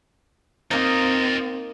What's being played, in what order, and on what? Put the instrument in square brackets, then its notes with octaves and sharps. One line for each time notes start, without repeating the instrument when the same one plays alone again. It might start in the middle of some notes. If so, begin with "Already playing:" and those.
[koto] A#3 D#4 [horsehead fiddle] C4 [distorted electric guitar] F4 D#5